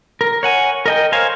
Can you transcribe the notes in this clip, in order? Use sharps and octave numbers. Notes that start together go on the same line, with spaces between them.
A#4
C#5 F#5 G#5
A#4 D#5 G5
A#4 C5 C#5 F5 G#5